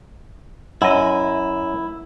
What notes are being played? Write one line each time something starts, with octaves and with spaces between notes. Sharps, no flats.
F#2 E4 D#5